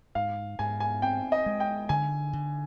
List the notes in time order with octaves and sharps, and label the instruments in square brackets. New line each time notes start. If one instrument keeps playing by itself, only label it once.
[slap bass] G#2 [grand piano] F5
[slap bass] G#2 [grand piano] G#5
[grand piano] G#5
[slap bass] C4 [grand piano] G5
[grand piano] D#5
[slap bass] G#3
[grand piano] G5
[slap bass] D3 [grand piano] G#5
[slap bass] D3